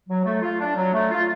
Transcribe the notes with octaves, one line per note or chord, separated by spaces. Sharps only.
F#3
A3
F4
D4
F#3
A3
F4